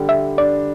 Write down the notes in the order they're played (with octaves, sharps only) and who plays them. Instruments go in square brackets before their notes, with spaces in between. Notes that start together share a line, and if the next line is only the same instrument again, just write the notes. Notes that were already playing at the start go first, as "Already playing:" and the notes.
Already playing: [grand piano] D3 G3
[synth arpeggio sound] E5
[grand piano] D4 [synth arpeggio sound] D5